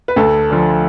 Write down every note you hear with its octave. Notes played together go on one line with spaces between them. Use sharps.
B4
D2 A4
D3 F3